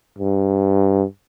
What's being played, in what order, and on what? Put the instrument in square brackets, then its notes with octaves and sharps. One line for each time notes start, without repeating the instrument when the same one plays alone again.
[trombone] G2